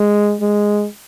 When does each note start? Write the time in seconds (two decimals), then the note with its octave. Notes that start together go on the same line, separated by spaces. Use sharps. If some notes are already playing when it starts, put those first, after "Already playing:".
Already playing: G#3
0.41 G#3